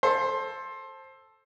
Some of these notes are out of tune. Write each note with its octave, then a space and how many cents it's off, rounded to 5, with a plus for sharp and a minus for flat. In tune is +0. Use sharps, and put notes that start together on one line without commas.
A4 +0 C5 +20